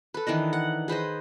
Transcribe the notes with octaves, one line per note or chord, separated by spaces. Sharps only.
A4 B4
D#3 E3 D4 D#5
F#5
G#4 B4 C5 D#5